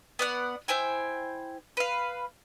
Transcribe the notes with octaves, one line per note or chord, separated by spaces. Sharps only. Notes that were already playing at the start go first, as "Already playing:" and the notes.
B3 D5 F#5
E4 C5 G5 G#5
B4 F5